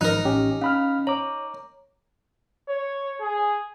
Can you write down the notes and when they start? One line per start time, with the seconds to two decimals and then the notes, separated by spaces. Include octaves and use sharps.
0.01 G#1 F3 D#4 A#4 F#6
0.25 A1 C#4 G4
0.61 C#4 F5 B5 F6
1.07 C#5 A#5 D6
2.69 C#5
3.21 G#4